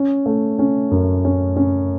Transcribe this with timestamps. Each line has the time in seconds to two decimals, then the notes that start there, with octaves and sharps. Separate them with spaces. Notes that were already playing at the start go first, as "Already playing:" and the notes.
Already playing: C#4
0.26 A3
0.59 C#4
0.91 F#2
1.25 C#4
1.57 C#4